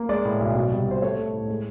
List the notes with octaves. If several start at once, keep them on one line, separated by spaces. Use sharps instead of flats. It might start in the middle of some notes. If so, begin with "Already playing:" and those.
Already playing: A#3
G#3 D5
A2
B1
B2
C2
B2
C5
A3 C#5
A3
A2
G#3